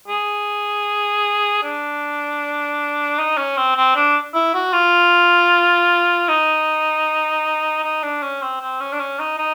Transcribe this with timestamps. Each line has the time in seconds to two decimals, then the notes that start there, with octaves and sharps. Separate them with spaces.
0.08 G#4
1.63 D4
3.18 D#4
3.37 C#4
3.57 C4
3.76 C4
3.96 D4
4.34 E4
4.54 F#4
4.73 F4
6.29 D#4
7.84 D#4
8.03 D4
8.23 C#4
8.42 C4
8.61 C4
8.80 C#4
8.93 D4
9.00 C#4
9.19 D#4
9.38 D#4